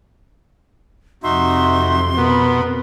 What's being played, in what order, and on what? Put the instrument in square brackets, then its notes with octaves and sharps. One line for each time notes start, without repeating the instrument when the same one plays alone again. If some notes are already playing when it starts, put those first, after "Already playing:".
[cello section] F2 C3 [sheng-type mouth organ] D#4 F#4 E5 [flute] C6
[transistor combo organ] B2 B3 [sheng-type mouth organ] A#4 B5